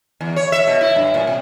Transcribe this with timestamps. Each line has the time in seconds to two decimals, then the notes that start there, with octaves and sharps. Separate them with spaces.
0.21 E2
0.36 C#5
0.52 E5
0.67 B2
0.81 E4
0.96 G2
1.14 A#2
1.27 C3